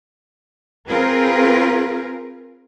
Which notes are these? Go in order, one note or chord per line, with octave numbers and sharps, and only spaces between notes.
C4 F4 G#4 A#4 B4